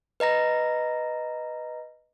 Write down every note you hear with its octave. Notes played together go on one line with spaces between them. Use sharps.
B4 D#5 A#5 A#6